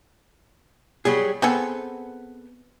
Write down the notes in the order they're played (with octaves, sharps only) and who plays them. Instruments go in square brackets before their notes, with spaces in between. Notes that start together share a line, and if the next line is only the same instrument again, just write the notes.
[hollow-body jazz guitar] F#3 G3 G#4
[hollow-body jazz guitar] B3 [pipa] C4 G#4 A4